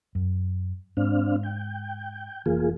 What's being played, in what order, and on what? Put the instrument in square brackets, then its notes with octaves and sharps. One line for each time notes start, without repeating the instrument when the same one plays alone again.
[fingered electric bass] F#2
[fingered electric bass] G#2 [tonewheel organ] C4 D4 F5
[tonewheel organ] G5
[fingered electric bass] F1 E3 [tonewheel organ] A#3 F4 G#4